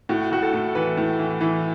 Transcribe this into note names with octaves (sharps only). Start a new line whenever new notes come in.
A2 F#4
A2 F#4
A4
A2
E3 B4
A2
E3
E3